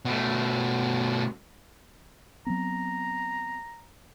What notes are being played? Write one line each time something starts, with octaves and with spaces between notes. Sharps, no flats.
B2 A3
F#3 B3 C4 A#5